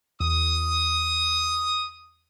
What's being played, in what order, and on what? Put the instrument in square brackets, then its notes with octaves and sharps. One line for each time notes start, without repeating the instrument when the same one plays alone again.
[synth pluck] E2 [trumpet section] D#6